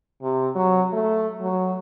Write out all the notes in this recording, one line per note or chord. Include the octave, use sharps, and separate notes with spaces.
C3
F#3
A3
F#3